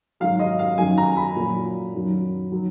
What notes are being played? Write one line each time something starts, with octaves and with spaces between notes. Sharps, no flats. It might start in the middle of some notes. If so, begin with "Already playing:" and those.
G#2 D#3 F#3 F5
D#5
F5
F#2 D#3 F#3 G#5
A#5
B5
A#2 F#3
F#2 D#3 F#3
D#3 F#3